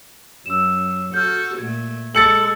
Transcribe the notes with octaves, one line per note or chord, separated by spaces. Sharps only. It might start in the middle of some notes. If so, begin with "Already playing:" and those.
F#2 E6 E7
F#4 A4 F6 G6
A#2 A3 G#6
G#3 A4 A6 C#7 F#7